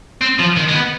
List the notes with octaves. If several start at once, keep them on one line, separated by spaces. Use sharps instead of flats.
C4
F3
D#3
G#3
B3